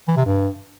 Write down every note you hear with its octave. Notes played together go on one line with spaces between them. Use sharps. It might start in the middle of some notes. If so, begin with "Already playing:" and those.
E3
C3
G2